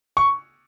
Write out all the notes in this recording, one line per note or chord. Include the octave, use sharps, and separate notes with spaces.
C#6